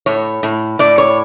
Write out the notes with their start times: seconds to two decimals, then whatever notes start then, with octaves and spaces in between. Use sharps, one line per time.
0.06 A2 C#5
0.43 A2
0.79 A2 D5
0.98 C#5